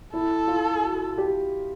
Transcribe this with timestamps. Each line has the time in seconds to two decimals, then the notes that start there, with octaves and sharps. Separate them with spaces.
0.14 E4 A4
0.48 F4
0.83 F#4
1.18 G4